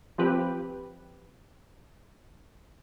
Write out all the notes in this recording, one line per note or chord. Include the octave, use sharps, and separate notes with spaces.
F3 C4 G4 B4